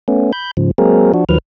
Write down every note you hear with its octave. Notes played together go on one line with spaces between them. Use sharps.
A3 B3 C#4
B5 G6
G#2 C#3 F3
F#3 G#3 A#3 C4 G#4 A#4
F3 D4 F#4
D#2 D#3 F3 F#3 B4 F6